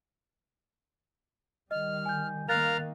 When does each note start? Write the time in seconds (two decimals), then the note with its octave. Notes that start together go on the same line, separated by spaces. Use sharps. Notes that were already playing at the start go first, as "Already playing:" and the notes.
1.71 D#3 G3 D#5 F6
2.06 G#5 G6
2.49 D#3 A#3 A#4 F5 F#6 A6 F7